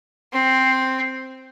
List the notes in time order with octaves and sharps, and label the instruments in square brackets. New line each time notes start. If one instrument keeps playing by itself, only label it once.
[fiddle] C4